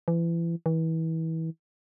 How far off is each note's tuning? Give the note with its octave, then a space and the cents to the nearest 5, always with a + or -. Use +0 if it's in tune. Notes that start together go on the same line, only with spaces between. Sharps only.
E3 +30
E3 -30